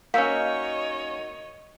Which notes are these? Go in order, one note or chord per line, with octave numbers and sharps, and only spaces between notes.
A#3 C#4 D#4 F#4 C#5 D#5 F5 E6